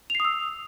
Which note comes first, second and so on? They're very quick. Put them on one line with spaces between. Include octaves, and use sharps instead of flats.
F7 C7 D#6 E6